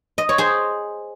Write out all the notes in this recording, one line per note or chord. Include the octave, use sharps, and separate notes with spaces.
D#5
C#5
G#4 C5